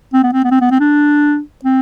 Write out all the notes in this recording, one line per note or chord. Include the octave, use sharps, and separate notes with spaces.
C4
B3
C4
B3
C4
B3
C4
D4
C4